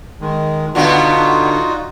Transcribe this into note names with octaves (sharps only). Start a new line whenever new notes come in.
D#3 G#3
B2 D3 B3 D#4 F4 F#4 D5 F5